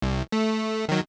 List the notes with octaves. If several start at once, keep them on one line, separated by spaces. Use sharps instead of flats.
C2
A3
D#3 F#3